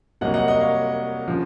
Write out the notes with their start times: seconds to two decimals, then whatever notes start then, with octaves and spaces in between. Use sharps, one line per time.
0.21 C2 C3 F#3 A#3 D#5 F#5
0.34 D#5 F#5
0.48 D#5 F#5
0.60 C#5 F5
1.28 C#3 F3